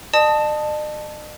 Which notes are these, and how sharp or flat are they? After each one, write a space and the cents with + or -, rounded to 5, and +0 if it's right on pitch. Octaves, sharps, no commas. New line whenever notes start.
D#5 -45 A5 +0 D#6 +0